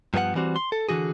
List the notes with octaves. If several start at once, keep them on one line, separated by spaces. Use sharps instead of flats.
G2 F3 B3 A4 F#5
E3 G3 C4 F#4
C6
A4
D3 E3 F#4 G#4